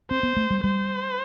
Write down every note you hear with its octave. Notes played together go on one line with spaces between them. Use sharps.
C4 C5
B3
A3
G3
G3 C5